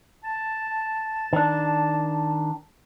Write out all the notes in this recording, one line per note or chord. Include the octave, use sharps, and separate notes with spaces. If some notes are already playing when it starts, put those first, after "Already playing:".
A5
D#3 D4